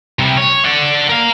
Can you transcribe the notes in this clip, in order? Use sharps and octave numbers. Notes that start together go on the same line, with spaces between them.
C3 G3
C#5
D5 F#5
A#4 F5